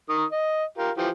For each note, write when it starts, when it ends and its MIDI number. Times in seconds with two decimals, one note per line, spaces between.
0.09 0.24 51
0.09 0.24 70
0.09 0.24 87
0.32 0.64 75
0.78 0.91 65
0.78 0.91 67
0.78 0.91 70
0.97 1.09 52
0.97 1.09 53
0.97 1.09 67